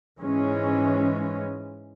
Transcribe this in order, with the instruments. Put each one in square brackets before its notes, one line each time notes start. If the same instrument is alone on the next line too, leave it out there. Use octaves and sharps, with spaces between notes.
[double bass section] G#2 E3 G#3 C#4